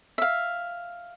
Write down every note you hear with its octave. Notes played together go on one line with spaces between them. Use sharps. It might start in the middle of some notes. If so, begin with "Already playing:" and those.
E5 F5